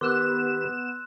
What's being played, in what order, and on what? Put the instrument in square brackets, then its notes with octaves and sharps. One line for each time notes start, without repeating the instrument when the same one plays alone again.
[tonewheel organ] D#3 G4 B4 [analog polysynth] B3 E7 [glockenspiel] C6 E6 F#6